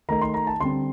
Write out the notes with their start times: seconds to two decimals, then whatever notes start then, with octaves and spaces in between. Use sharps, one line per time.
0.09 D#3 A3 D#4 A#5
0.21 C6
0.34 A#5
0.47 A5
0.60 D3 G3 C4 C6